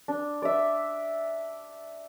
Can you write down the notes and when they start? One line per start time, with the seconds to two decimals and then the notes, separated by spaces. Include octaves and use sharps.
0.08 D4
0.42 D5 E5